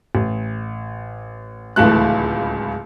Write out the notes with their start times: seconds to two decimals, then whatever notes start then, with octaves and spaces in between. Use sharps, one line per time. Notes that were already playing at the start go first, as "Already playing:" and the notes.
0.15 A1
1.76 D1 C#2 E3 A3 F#6